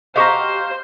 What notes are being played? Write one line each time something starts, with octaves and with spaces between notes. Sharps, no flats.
F#4 G4 C5 D#5 F5 A#5